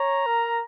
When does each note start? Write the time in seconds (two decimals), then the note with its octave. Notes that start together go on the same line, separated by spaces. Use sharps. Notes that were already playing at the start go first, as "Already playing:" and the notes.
Already playing: C#5 A#5
0.26 A#4